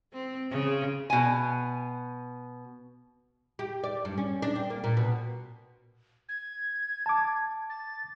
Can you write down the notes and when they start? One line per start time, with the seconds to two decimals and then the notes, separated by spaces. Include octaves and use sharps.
0.13 C4
0.51 C#3
1.10 B2 G#5
3.59 G4
3.84 D5
4.05 G2
4.18 C#4
4.42 D4
4.55 C4
4.70 A#3
4.84 A#2
4.97 B2
6.29 G#6
7.06 A5 D6
7.70 A6